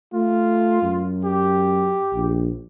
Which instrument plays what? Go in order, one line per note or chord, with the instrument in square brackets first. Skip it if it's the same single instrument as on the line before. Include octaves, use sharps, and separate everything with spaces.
[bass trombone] A3 [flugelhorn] F4
[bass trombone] F#2
[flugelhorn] G4
[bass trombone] A#1